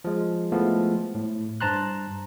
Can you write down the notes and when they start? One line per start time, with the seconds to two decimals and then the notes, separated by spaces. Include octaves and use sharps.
0.04 F3 G#3
0.52 F3 G#3 A3 B3 E4
1.15 A2
1.61 G2 C5 A5 A#5 C6 F#6